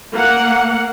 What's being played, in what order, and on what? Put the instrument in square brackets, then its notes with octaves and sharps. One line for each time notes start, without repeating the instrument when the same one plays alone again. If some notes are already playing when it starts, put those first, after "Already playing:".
[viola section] A#3 F#5